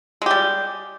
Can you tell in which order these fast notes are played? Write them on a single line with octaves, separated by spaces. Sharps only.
G#3 G4 G3